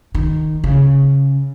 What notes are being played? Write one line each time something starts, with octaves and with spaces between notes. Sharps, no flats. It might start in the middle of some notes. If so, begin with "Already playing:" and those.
D#3
C#3